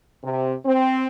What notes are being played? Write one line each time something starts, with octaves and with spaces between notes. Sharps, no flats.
C3
C4